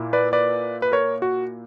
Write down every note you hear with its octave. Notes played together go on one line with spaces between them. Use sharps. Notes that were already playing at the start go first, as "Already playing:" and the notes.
Already playing: A#2 A#3 E4
B4 D5
B4 D5
B4
A#4 C#5
F#4